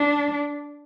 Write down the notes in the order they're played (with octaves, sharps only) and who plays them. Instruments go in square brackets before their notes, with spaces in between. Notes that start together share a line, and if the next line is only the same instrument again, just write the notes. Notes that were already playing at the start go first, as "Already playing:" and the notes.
Already playing: [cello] D4